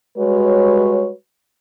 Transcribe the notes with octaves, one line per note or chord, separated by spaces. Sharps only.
G3 G#3 F#4 B4 C#5